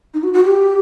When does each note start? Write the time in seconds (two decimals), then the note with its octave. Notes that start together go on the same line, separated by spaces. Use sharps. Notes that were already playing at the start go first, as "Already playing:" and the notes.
0.14 D#4
0.23 F#4
0.33 F#4
0.45 G4